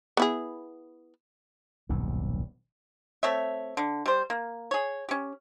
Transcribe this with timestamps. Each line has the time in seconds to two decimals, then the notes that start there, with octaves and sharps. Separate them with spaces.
0.17 B3 E4 G#4
1.89 D#1 B1 G2 C3
3.23 A3 C4 C#5 E5
3.77 D3
4.06 G3 C5
4.30 A#3
4.71 G#4 C#5
5.09 C#4 G4